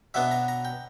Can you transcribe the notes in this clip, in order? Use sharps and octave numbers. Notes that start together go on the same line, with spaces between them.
B2 F#3 B3 D4 E5
A#5
A#5
G5